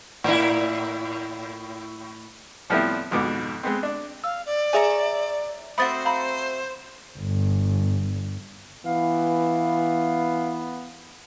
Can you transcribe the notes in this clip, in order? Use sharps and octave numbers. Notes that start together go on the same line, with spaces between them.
A2 E4
A2 F3 G3 B3 C4 E4
G#1 F2 G#2 B2 B3 D6
G#3 B3 C4
D4
F5 E6
D5
G#4 C#5 E5 G#5 A#5
A3 C4 F#4 C5 B5 D#6 A6
F5 A#5 B5
G1
E3 B3 F5